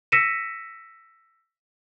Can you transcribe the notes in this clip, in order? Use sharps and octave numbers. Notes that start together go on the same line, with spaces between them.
E6 A#6 B6 C#7 D#7 E7